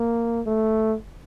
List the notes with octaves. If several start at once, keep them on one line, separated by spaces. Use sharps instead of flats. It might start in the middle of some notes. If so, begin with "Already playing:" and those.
Already playing: A#3
A3